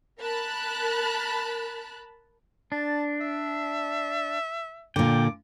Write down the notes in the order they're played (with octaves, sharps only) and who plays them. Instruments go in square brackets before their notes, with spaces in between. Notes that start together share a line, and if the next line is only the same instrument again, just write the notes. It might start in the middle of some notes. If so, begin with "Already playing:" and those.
[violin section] A#4 A5 B5 F#6
[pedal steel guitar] D4 [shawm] A5
[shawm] E5
[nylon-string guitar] A#2 D3 [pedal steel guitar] G5 [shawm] D6